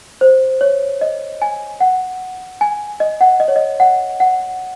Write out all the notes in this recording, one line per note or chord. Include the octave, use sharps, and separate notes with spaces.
C5
C#5
D#5
G#5
F#5
G#5
D#5
F#5
D#5
C#5
D#5
F#5
F#5